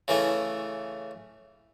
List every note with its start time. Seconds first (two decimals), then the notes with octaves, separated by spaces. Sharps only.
0.08 C#3 E3 A3